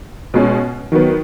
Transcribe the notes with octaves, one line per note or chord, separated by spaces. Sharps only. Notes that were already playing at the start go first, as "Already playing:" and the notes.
B2 G#3 C#4
D#3 F#3 B3